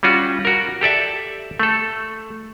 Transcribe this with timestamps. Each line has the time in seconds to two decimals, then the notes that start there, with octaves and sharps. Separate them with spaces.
0.03 G3 C#4 F4 F#4
0.45 F#4 A#4
0.81 G4 A4 D5 E5
1.60 A3 A4